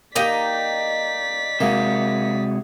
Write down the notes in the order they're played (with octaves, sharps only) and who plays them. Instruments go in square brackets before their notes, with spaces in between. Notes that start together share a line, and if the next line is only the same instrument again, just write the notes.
[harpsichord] A#3 G4 [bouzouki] D#4 G5 [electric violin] D5 B6
[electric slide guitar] C3 G#3 F#4 [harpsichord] A#3